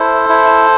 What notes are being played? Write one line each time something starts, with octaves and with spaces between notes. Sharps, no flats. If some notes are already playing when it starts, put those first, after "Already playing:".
Already playing: E4 A4 C5
E4